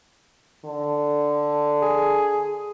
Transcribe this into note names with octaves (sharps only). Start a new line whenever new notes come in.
D3
G#4